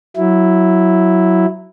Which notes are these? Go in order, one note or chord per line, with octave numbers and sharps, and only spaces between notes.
F#3 E4